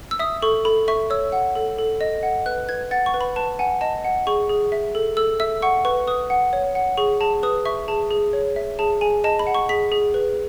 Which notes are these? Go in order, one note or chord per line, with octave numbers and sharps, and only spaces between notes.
E6
E5 D#6
A4 C#6
A4 B5
E5 C#6
C#5 E6
F#5
A4
A4
D#5
F#5
B4 F#6
B4 G#6
F#5 A6
C#6
B4
B5
B4 A5
F#5 G#5
D#5 A5
F#5
G#4 C#6
G#4
E5
A4
A4 E6
E5 E6
F#5 C#6
B4 C#6
B4 D#6
F#5
C#5
F#5
G#4 C#6
G#4 A5
B4 D#6
E5 C#6
G#4 A5
G#4
C#5
E5
G#4 A5
G#4 G#5
D#5 A5
B5
F#5
C#6
G#4 B6
G#4
B4